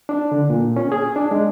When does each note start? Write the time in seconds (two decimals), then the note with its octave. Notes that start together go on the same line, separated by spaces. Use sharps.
0.09 D4
0.32 D3
0.50 A#2
0.76 C#4
0.92 G#4
1.16 D4
1.31 G#3